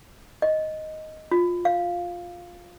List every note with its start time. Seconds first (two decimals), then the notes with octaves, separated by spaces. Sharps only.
0.42 D#5
1.31 F4
1.65 F5